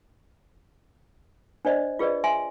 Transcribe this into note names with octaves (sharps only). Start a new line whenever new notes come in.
D4 C5 D5 D#5
F4 G#4 B4 D5 D#5
E5 G#5 C6